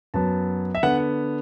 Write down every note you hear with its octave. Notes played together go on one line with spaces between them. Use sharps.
F#2 F#3 B3 A5
E5
D3 B3 F#5